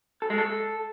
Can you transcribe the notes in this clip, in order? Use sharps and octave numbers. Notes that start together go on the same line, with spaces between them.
A4
G#3
A4